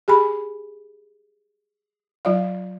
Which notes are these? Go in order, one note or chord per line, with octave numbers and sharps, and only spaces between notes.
G4 G#4 G#5 B5
F#3 F4 D5 F5